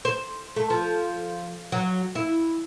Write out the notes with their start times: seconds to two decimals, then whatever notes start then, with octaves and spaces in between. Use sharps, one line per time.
0.05 C5
0.56 A3
0.70 F3
1.72 F#3
2.15 E4